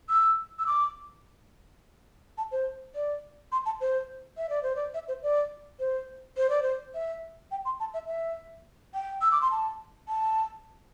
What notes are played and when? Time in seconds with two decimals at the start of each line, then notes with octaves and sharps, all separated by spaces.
0.09 E6
0.59 E6
0.67 D6
2.38 A5
2.52 C5
2.95 D5
3.52 C6
3.66 A5
3.81 C5
4.38 E5
4.50 D5
4.63 C5
4.76 D5
4.94 E5
5.08 C5
5.23 D5
5.80 C5
6.37 C5
6.50 D5
6.62 C5
6.95 E5
7.51 G5
7.65 C6
7.80 A5
7.94 E5
8.08 E5
8.94 G5
9.22 E6
9.32 D6
9.42 C6
9.51 A5
10.08 A5